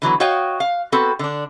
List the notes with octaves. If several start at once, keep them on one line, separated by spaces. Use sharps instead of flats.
D3 E3 F#3 B3
F#4 C#5 D#5 F5 G5
F5
B3 C4 F#4 A4 B4
D3 D4